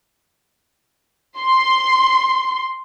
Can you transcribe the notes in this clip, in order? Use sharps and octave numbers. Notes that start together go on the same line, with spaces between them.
C6